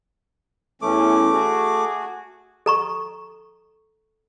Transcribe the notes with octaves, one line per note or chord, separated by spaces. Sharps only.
E2 E3 A3 C#4 D6
F#4 G#4
A4 A#5 C#6